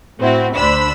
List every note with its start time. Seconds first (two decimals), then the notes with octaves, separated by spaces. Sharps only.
0.20 A2 C4 E4 F#4
0.56 D2 D4 C5 B5 E6